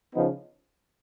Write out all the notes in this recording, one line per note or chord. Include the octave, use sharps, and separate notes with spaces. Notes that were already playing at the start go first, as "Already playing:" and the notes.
C#3 F3 B3 D#4